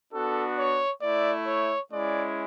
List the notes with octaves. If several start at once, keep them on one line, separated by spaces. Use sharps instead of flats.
B3 D4 F#4 A4
C#5
A3 E4 D5
C#5
G#3 C#4 E4 D5